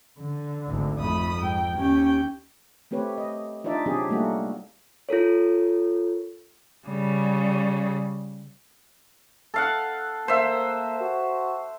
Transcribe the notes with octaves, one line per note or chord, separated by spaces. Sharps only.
D3
G#1 D2
F2 A3 B5 D#6
G#2 G5
D#2 C#4 G4 G5
A3 C4 G4 B4 C#5
D#5
D4 D#4 F4 D5 E5
C3 F#3 C4 D4 G4 G#4
G3 A3 A#3 D#4 F#4
F4 A4 A#4 C#5
C#3 G3
A4 F5 F#5
A#3 C5 E5
F#4